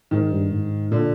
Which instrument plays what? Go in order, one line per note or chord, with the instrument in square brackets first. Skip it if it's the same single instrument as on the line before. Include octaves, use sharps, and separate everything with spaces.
[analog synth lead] G#2 [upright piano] D#3
[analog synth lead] G2
G#2
[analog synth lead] A#2 [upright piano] D3